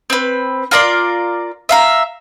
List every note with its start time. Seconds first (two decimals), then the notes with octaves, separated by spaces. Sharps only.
0.10 C4 B4
0.71 F4 A#4 D5 C6
1.69 E5 F5 A#5